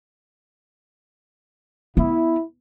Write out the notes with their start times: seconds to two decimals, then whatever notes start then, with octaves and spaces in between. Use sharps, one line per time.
1.97 B3 E4